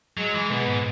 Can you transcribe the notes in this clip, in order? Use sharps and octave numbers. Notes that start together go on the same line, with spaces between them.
F#3 G#3
E3
B2 B3
G#2